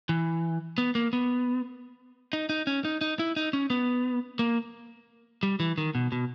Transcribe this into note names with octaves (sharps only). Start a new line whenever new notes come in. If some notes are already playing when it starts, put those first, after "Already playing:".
E3
B3
A#3
B3
D#4
D#4
C#4
D#4
D#4
E4
D#4
C#4
B3
A#3
G3
E3
D#3
B2
B2